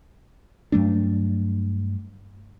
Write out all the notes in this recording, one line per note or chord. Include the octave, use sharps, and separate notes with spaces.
G2 F#3 A3 D4